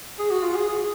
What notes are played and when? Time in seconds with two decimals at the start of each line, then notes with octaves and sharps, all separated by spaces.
0.19 G#4
0.30 F#4
0.43 F4
0.55 G#4
0.68 G#4